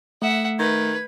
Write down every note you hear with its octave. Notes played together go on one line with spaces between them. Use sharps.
A3 E5 F#5
D#3 B4 G#6